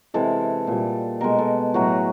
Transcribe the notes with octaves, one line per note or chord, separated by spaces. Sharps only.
C3 E3 G#3 A4
A#2 G3
B2 G#3 A#4
A4
A2 F#3 A3 F#4